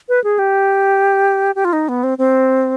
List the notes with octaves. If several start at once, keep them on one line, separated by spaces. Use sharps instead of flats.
B4
G#4
G4
G4
F4
D#4
B3
C4
C4